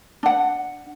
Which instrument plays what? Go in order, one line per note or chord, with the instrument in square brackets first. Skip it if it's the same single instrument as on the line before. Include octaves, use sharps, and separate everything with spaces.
[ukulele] D4 F#5